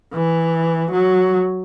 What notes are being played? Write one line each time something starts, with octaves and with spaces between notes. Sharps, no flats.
E3
F#3